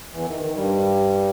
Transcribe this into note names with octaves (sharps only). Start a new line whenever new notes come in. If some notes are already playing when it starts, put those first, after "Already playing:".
E2 E3
D#3
D#3
G2 G3